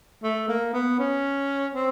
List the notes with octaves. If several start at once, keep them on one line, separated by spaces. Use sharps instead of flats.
A3
A#3
B3
C#4
C4